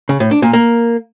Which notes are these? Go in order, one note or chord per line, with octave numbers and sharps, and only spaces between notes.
C#3
A2
D4
A#2
A#3